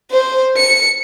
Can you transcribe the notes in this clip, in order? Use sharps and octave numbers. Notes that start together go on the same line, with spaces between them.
C5
C#7